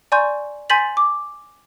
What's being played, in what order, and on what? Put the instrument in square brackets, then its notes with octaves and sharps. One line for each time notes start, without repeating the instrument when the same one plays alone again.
[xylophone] D5 G#5 A#5 C6 C#6 G6
G#5 C6 G6 A6 B6 F#7
D6